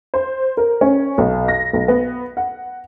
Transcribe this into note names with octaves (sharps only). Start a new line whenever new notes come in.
C5
A#4
C#4
B1
A#6
B1
B3
F#5